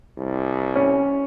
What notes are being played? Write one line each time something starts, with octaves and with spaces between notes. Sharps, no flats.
C2
C#4